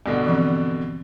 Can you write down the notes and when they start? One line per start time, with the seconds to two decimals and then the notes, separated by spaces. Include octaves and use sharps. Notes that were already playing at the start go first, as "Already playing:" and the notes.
0.06 G2 B2 D3
0.24 E3 F3 C4